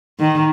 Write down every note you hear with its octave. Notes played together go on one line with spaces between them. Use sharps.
D#3